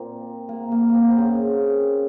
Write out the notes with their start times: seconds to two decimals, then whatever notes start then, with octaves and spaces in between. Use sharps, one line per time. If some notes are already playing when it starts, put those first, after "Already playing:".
Already playing: A#2 A#3 C4
0.49 A#3
0.72 A#3
0.89 A#3
0.95 C4
1.11 C4
1.18 C#3 C#4